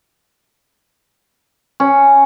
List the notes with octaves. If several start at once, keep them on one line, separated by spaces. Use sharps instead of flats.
C#4